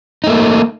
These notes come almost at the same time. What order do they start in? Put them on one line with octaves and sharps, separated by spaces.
D#4 A3 A#3